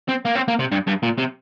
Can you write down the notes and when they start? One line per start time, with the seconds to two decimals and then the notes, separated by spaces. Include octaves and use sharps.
0.09 C4
0.25 A#3
0.35 C4
0.48 A#3
0.59 C3
0.72 G2
0.87 G2
1.03 A#2
1.18 C3